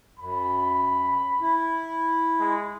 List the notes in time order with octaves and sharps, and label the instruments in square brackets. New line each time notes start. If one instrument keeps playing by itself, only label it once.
[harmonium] F#2 [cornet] B5
[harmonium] E4
[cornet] G#3